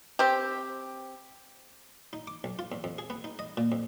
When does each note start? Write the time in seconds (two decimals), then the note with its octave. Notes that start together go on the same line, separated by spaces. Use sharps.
0.19 C4 G4
2.13 D#4
2.27 D6
2.44 B1
2.59 F4
2.72 E2
2.84 F2
2.98 G#4
3.10 B3
3.24 D#4
3.39 D#5
3.57 A#2
3.72 F2